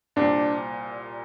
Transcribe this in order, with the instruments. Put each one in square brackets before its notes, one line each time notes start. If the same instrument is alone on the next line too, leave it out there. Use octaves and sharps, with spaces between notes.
[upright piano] C2 A#2 G3 C4 [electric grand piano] D4